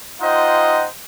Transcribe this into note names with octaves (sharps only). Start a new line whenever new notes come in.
D#4 F4 C5 D#5 F#5 G5